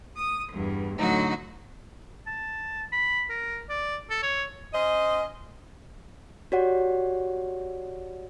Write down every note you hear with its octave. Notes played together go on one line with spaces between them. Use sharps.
D#6
E2 G2
A2 D3 F#3 D#4 F#4
A5
B5
A#4
D5
A4
C#5
C#4 C5 D#5
F#4 G4 C#5 D5 F#5